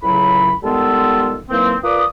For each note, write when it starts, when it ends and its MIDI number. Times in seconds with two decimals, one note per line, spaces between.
0.02 0.52 37
0.02 0.52 45
0.02 0.52 49
0.02 0.52 54
0.02 0.52 83
0.63 1.36 51
0.63 1.36 55
0.63 1.36 56
0.63 1.36 59
0.63 1.36 65
0.63 1.36 69
1.49 1.75 51
1.49 1.75 52
1.49 1.75 54
1.49 1.75 58
1.49 1.75 60
1.83 2.04 65
1.83 2.04 70
1.83 2.04 71
1.83 2.04 74
1.83 2.04 86
1.83 2.04 87